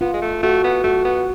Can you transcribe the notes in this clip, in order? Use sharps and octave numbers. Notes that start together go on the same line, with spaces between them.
B3 F4
G#3
A3
A3 F#4
B3
A3 F#4
B3